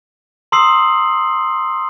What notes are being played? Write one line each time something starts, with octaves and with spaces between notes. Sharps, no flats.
A#5 C6 D#6 E6 C7 F#7